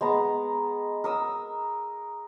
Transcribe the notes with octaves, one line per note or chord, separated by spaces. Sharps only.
G#3 B3 A#5
A#4 D#6 E6